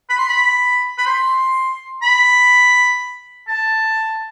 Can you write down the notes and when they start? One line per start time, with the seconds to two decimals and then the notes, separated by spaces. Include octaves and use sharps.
0.09 B5
0.18 C6
0.28 B5
0.98 B5
1.06 C6
2.02 B5
3.48 A5